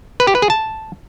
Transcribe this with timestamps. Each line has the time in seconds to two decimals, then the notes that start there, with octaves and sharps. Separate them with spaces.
0.20 B4
0.27 G4
0.35 B4
0.42 G#4
0.50 A5